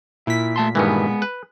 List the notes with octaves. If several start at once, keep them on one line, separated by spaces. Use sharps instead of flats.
A#2 E4 B6
A3 A5 C6
G2 D#3 E3 G#3 B3
B4